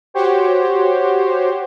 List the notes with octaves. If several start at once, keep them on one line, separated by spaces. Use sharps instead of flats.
F#4 G4 C5 C#5